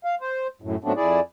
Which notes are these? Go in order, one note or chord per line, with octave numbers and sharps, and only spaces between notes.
F5
C5
F#2 A2
G#2 F#3 A3 B3 C4 D4
F2 E4 G#4 D5